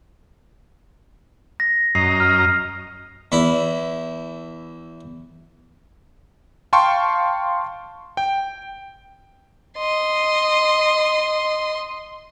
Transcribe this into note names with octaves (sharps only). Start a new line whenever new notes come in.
A#6
F#2 D#5 A#5 C7
F6
E2 E4
F5 G5 A5 C6 C#6
G5
D#5 C6